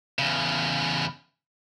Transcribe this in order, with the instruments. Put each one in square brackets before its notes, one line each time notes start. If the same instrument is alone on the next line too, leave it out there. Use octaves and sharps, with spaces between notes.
[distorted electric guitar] E2 C#3